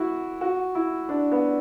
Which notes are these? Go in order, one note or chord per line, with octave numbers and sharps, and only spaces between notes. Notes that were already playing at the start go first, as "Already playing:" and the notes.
Already playing: E4 F#4
F#4
E4
D4
B3